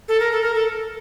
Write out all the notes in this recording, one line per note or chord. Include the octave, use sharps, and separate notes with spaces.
A4
A#4
A4
A#4
A4